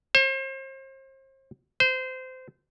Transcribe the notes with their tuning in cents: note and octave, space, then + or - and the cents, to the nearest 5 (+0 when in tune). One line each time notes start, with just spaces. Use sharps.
C5 +35
C5 -25